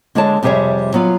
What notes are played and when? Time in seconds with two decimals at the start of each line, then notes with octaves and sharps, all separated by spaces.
0.15 D3 G#3 D4 G#4 C#5 A5
0.43 F2 C3 G3 G#4 C#5 E5
0.94 F#3 B3 F4